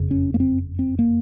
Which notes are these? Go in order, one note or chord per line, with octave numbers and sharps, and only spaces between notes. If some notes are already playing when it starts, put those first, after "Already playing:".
Already playing: F#1 F2 C#3
C#4
A#3
C4
C4
A#3